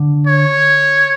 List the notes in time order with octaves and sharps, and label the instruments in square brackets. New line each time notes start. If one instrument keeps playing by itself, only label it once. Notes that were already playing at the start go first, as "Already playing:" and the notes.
Already playing: [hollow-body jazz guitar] D3
[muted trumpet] C#5